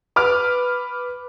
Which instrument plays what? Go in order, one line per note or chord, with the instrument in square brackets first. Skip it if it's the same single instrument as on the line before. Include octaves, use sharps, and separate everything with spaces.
[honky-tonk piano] B4 D6 F6